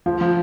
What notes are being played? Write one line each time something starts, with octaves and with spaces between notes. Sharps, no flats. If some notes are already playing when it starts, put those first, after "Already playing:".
F3 F4
F3